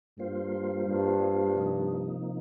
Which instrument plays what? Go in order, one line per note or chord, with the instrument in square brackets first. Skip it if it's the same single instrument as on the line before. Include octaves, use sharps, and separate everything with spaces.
[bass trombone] G2 [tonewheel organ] G3 A#3 F4 C5
[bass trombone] G2
[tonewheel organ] C3 F3 A#3 D#4